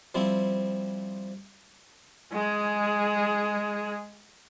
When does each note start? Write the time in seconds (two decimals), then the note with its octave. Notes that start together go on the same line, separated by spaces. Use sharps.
0.15 F3 G3 C4 E4
2.32 G#3 G#4